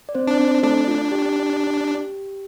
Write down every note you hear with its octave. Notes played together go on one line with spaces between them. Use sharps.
D5
C4 C5
D4
C4 C5
A3 D4 A4
F4
G4